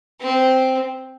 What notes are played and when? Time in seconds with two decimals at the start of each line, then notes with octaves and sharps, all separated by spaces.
0.20 C4